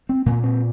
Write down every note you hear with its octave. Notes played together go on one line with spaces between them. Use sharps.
C4
A#2 A#3
C4